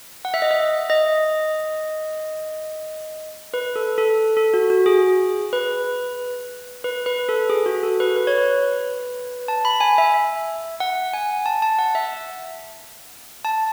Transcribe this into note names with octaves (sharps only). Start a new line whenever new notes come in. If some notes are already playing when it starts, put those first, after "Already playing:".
F#5
E5
D#5
E5
D#5
B4
A4
A4
A4
F#4
F#4
G#4
B4
B4
B4
A4
G#4
F#4
A4
B4
B4
C#5
B4
A5
B5
G#5
E5
E5
F#5
G#5
A5
A5
F#5
E5
A5